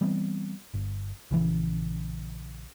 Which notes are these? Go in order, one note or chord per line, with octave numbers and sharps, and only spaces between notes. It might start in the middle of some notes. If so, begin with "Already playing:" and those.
E3 G3 B3 C4
G1
A#1 C#3 E3